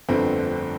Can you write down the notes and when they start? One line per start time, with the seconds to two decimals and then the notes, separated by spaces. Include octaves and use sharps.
0.08 G1 F2 D3 A3 C4